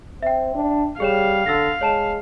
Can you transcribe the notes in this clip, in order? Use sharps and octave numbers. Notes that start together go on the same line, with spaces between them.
C4 E5 G5
D4
G3 G#4 C#5 F5 E7
D3 E6 A6 A#6
G#3 C#5 A5 E7